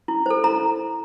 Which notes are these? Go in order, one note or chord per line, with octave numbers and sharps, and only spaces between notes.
E4
A4 C5
E4 A#5